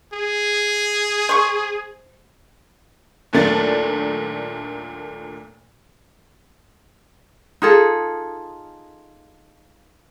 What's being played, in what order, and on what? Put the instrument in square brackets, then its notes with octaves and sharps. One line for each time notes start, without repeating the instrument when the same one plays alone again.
[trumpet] G#4
[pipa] C5 C#6
[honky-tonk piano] D#2 A#2 F#3 A3 D4 A6
[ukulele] D#4 F4 G#4 A4